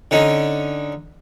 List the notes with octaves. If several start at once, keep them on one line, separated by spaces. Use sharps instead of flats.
D3 C#4 D#4